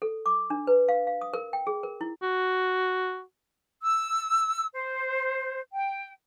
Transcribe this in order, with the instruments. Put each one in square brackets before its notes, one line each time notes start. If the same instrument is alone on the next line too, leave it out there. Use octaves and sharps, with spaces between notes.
[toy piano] A4
D6
D4
B4
F5
F5
D#6
A#4
G5
G#4
A#4
E4
[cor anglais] F#4
[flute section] E6
C5
G5